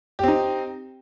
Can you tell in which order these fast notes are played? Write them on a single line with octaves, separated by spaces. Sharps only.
G4 C4 D#4